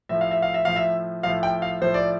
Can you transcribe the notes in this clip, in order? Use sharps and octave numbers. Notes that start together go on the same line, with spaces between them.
A2 F3 E5
F5
E5
F5
E5
A2 F3 F5
E5
A2 F3 F5
G5
F5
A2 F3 C5
D5